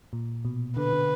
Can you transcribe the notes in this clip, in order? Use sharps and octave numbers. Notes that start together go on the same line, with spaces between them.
A#2
B2
D3 B4
D3